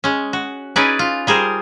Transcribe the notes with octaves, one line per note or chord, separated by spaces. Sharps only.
G#3 C#4
F#4
C#4 D#4 E4 G#4 B4 D5
F4
G3 G#4 A#4 C5